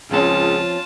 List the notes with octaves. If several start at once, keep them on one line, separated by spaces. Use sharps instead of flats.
C#2 F3 C4 C#4 F4 G#4 A5